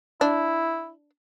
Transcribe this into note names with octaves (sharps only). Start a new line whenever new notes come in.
D4 E4